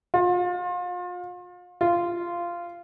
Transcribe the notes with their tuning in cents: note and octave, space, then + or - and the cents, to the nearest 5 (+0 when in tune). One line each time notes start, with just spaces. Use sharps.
F4 +35
F4 -10